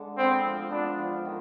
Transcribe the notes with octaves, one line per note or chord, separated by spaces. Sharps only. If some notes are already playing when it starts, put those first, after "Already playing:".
Already playing: D3 G#3
B3 C4
F3
B3 D4
F3
D#3